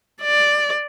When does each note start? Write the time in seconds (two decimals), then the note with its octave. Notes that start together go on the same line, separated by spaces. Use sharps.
0.22 D5